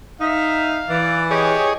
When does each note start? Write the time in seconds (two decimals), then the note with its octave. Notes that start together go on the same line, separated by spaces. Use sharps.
0.21 D#4 E5 F5
0.90 E3 D5
1.31 G4 G#4 C#5 D#5